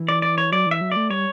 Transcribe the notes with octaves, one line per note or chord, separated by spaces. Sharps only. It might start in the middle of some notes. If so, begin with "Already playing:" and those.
Already playing: E3
D5
D5
C#5
F#3 D5
E3
E5
F#3
A3 D5
G3 C#5